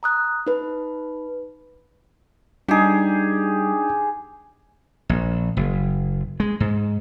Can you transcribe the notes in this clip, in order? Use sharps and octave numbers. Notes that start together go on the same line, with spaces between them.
A#5 D#6 F#6
D#4 B4
G3 D4 D#4 G4 G#4
A#1
F#1
G#3
G#2